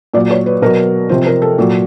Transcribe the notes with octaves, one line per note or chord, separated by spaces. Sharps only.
A#2 F#3 D5
C#5
B4
B2 F#3 A#4
C3 F3 C5
A#4
A4
A#2 F#3